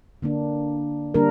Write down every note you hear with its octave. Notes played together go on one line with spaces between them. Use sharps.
D3 A#3 D4
D3 G3 A#3 D4 A#4